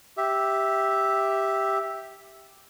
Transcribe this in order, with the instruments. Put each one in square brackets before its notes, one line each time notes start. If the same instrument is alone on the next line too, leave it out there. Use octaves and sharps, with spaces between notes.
[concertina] G4 E5